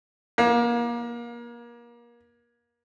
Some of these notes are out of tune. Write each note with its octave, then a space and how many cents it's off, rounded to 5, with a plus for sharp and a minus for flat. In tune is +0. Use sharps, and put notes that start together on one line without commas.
A#3 +30